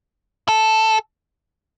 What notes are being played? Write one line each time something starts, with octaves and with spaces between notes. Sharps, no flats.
A4